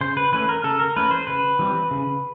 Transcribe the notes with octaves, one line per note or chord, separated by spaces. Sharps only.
C#3 C5
B4
E3 A3 C#4 B4
A#4
C#3 A4
A#4
E3 A3 C#4 B4
C5
C#3 B4
E3 G3 C4
C#3